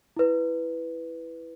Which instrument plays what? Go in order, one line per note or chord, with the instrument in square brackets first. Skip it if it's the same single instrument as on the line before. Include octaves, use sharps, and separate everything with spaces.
[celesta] E4 B4